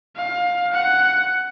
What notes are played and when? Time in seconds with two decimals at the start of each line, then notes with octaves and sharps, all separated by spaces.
0.17 F5
0.73 F#5